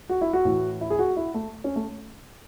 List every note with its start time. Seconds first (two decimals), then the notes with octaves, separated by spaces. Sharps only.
0.09 F#4
0.21 E4
0.33 F#4
0.45 A2 E3
0.81 E4
0.90 G#4
0.99 F#4
1.17 E4
1.34 A3
1.64 C#4
1.76 A3